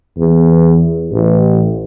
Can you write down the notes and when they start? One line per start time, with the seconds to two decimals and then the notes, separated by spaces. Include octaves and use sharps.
0.18 E2
1.11 A1